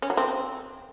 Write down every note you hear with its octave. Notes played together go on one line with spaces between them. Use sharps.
C#4
F#3
C4